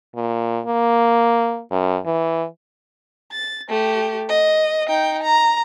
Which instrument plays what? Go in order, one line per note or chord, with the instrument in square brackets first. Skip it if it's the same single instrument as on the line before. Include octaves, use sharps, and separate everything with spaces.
[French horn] A#2
A#3
F#2
E3
[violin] A6
A3 G4
D#5
D#4 G5
A#5